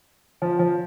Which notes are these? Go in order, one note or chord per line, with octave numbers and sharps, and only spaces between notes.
F3
F3